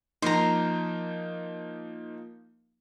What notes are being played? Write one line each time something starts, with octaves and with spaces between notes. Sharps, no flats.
F3 A#3 D#4 A#5 C6